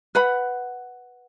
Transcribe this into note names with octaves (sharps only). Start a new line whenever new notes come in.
B4 F#5 B5